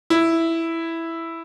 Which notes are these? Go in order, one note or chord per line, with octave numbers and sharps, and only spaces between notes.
E4